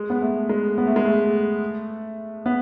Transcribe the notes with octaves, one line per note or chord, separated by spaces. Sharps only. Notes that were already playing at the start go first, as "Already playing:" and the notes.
Already playing: G#3
B3
A3
G#3
B3
A3
G#3
A3
B3